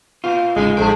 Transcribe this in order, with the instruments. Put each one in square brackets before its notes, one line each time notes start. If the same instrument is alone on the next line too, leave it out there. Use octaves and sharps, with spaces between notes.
[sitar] A#2 [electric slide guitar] F4
[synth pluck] A1 [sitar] C#3 D#4 [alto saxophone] G#3
[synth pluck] A1 A4 D7 [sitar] G2 F3 G#4